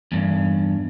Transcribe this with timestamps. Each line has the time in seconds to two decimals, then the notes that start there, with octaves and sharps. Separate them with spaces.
0.12 E2 G2